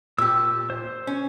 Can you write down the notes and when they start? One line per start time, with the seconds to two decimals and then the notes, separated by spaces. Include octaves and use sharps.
0.18 A#2 G4 E6
0.70 C5
1.07 C#4